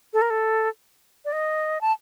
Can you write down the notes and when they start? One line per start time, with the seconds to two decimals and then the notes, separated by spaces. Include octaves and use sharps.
0.13 A4
0.22 A#4
0.30 A4
1.25 D5
1.33 D#5
1.81 A5